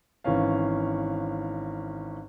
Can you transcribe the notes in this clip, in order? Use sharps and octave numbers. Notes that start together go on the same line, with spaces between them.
G#1 E3 C#4 F5